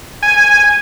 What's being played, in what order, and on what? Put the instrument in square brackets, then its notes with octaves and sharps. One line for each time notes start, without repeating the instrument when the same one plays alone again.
[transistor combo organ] G#5